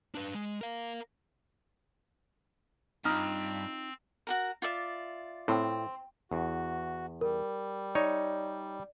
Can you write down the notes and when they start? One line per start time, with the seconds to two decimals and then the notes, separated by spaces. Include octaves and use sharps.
0.15 D4 B4
0.34 G#3
0.61 A#4 F5
3.05 G2 C4 D#4 F4 F6 F#6
4.27 F#4 G4 A#4
4.62 F4 D5 E5
5.48 A2 C4
6.32 E2 F#4
7.21 G3 A#4
7.95 D#4 C#5 D5